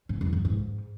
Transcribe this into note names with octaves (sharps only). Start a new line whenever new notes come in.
G#2
F#2
F#2
G#2